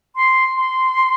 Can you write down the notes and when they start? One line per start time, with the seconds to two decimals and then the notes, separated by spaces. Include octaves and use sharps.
0.15 C6
0.56 C6